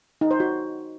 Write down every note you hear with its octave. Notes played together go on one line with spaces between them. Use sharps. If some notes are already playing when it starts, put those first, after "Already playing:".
D#4
C5
F#4